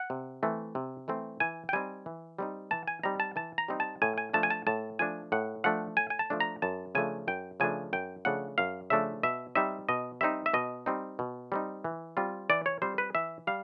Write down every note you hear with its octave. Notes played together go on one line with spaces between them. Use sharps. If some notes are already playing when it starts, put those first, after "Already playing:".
Already playing: F#5
C3
E3 A3 C4
C3
E3 A3 C4
E3 G#5
G5
G3 C4 D#4 G#5
E3
G3 C4 D#4
E3 A5
G#5
G3 C4 D#4 A#5
A5
E3 A5
A#5
G3 C4 D#4
A5
A2 G#5
G#5
F3 A3 D4 A5
G#5
A5
A2 A5
F3 A3 D4 G#5
A2 F#5
F3 A3 D4 F#5
A2 G#5
G#5
A5
F3 A3 D4
A#5
F#2 A5
C#3 F3 A3 D4 G#5
F#2 G5
C#3 F3 A3 D4 G#5
F#2 G5
C#3 F3 A3 D4 F#5
F#2 F5
C#3 F3 A3 D4 E5
B2 E5
G3 C4 D#4 E5
B2 D#5
G3 C4 D#4 E5
E5
B2 D#5
G3 C4 D#4
B2
G3 C4 D#4
E3
G3 C4 F4
E3 D5
C#5
G3 C4 F4 C5
B4
E3 E5
G3 F5